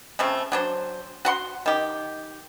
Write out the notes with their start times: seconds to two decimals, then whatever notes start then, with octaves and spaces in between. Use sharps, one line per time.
0.19 C#3 F3 A3 C4
0.52 F#3 D4 C5
1.25 F#4 F#5 C6
1.66 D#3 G4